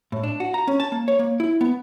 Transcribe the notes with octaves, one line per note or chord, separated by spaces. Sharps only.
A2
D4
F#4
A#5
C#4
A5
A#3
C#5
A#3
E4
B3